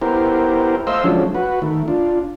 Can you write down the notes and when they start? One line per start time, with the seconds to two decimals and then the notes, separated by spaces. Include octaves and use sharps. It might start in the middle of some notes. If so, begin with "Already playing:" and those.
0.02 B3 E4 G4 A#4 C5
0.87 A3 C5 D#5 F5 C6 E6
1.04 F3 F#3 G#3 A3 C#4 D4
1.35 F#4 B4
1.62 D#3 A3
1.88 D4 F4